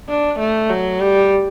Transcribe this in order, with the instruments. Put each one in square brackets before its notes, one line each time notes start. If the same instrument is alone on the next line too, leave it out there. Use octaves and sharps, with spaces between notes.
[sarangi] D4
A3
F#3
G3